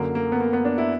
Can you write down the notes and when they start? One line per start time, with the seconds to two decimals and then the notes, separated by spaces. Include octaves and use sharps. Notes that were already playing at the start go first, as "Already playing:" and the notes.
Already playing: F#2 D3 A#3
0.15 A#3
0.32 B3
0.41 A#3
0.53 B3
0.65 D4
0.78 E4